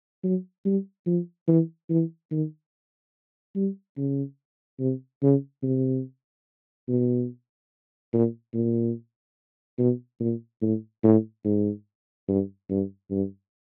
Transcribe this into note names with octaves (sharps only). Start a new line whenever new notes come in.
F#3
G3
F3
E3
E3
D#3
G3
C#3
C3
C#3
C3
B2
A#2
A#2
B2
A#2
A2
A2
G#2
G2
G2
G2